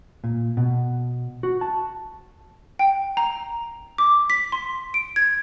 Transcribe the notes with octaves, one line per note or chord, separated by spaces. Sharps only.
A#2
B2
F#4
A5
G5
A#5
D6
B6
C6
D7
G#6